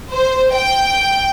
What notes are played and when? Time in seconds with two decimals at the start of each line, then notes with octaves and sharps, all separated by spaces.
0.12 C5
0.53 G5